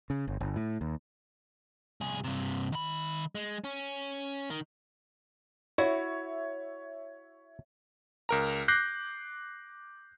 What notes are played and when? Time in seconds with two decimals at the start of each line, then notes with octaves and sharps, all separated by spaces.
0.10 C#3
0.28 G1
0.41 G1
0.56 A2
0.81 D#2
2.01 C2 G#4
2.24 G2 C3
2.72 D#3 B5
3.35 G#3
3.64 C#4
4.50 D#3
5.78 E4 F#4 C#5 E5
8.29 C#2 A#4 A#5
8.68 D6 F#6 G6 A#6 C7